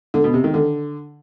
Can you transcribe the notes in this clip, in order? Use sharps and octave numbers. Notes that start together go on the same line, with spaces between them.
D3
B2
C3
D#3
D3